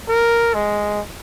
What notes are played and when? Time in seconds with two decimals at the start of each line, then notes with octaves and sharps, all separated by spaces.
0.09 A#4
0.54 G#3